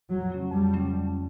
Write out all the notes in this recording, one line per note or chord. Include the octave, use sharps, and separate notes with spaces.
F2 F#3
C#3 F#3 A3 C#4
F2 G3
C#3 F#3 A3 C#4
F2